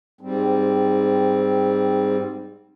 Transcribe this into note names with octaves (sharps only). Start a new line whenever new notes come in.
G#2 G3 C4